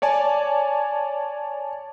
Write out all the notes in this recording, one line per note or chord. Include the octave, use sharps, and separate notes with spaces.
C#5 D5 G#5 A5